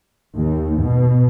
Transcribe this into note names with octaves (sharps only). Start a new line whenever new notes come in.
D#2
B2